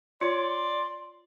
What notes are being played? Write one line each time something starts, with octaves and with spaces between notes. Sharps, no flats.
F4 C#5 D5 C6